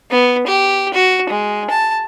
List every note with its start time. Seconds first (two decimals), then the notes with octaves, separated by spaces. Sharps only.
0.11 B3
0.46 G4
0.94 F#4
1.30 G#3
1.70 A5